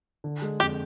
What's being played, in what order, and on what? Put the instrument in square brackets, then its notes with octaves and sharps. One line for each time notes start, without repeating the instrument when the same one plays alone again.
[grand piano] D3
G#3
[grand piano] F2 [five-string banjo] G4